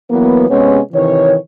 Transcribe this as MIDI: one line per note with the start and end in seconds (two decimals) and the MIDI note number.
0.10 0.45 52
0.10 0.45 54
0.10 0.45 58
0.10 0.45 59
0.50 0.78 48
0.50 0.78 56
0.50 0.78 59
0.50 0.78 61
0.50 0.78 68
0.50 0.78 73
0.93 1.36 48
0.93 1.36 51
0.93 1.36 52
0.93 1.36 73